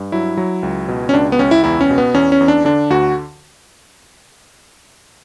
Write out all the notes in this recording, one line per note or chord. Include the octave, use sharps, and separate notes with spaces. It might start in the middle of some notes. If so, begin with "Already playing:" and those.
Already playing: G2
F#3 E4
F#3
C#2
B2
C#4
C#2 D4
B3
C#2 C#4
E4
E2 E4
C#4
B2
B3
E2 C#4
C#4
E2
D4
D3 D4
D2 F#4